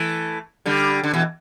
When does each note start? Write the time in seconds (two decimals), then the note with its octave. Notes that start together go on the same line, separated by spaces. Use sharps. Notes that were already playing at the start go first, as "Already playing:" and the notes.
Already playing: E3 A3
0.66 D3 G3
1.04 D3
1.14 B2 E3